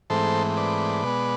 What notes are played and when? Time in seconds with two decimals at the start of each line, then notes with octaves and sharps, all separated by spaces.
0.10 G#2 E3 A3 C4 A4 C5
0.57 B4 D5
1.04 B2 G#3 B3